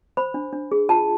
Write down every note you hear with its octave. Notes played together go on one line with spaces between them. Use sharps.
C5 B5
D4
D4
G#4
F4 A5